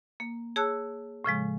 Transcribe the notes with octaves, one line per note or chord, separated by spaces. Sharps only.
A#3
G#4 C#5 A5 E6 F#6
A2 C#3 F3 G#3